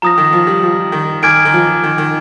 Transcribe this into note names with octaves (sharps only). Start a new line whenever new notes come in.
F3 A#5 D#6 A#6
D#3
F3
G3
F3
D#3
D#3 G#5 D6 F6 G#6 D7
D#3
F3
D#3
D#3